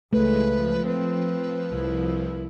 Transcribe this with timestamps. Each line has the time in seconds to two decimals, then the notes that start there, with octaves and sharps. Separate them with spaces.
0.13 C#2 E3 G#3 A3 B4
0.47 F3
0.85 C4 B4
1.71 C2 E4